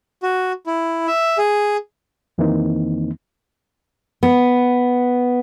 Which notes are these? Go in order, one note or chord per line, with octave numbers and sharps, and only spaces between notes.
F#4
E4
E5
G#4
F2 D#3 E3 A#3 C4 D#4
B3